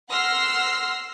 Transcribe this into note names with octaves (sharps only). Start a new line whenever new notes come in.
F#5 C6 E6 F6 A#6 C7